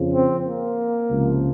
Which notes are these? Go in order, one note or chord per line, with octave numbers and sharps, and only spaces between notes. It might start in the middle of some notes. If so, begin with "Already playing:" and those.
Already playing: F2 C#3 F3
C4
A#3
C#2 C3 F3